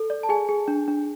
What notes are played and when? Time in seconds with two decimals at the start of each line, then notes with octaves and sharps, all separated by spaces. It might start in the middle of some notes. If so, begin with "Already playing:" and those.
Already playing: A4
0.10 D5
0.23 A5
0.29 G#4 G#5
0.49 G#4
0.68 D4
0.88 D4